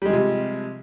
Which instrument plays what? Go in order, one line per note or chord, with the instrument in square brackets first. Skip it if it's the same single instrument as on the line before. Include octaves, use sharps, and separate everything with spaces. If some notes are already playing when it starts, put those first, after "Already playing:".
[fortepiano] G3
G#3
F3
C3